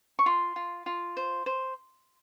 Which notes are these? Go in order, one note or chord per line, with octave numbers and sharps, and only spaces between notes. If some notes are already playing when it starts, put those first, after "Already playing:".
C#6
F4 C6
F4
F4
C5
C5